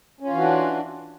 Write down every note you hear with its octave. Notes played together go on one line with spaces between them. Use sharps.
E3 C#4 D4 F4 F#4